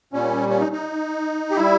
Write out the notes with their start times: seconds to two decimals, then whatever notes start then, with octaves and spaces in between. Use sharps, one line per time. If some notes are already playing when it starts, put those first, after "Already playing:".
0.13 A#2 G3 C#4
0.49 C#4
0.60 D#4
0.72 D#4
1.51 G4
1.56 G3 E4